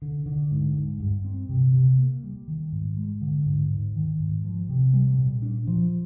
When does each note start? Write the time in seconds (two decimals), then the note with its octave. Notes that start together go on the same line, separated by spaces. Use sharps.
0.02 D3
0.26 D3
0.51 G#2
0.76 G#2
1.00 G2
1.24 C4
1.49 C3
1.74 C3
1.98 A#3
2.24 G3
2.48 D#3
2.72 G#2
2.97 G#3
3.21 D3
3.46 G#2
3.70 G#2
3.95 D#3
4.19 G#2
4.44 F3
4.69 C3
4.94 G3
5.18 A#2
5.42 D4
5.67 F3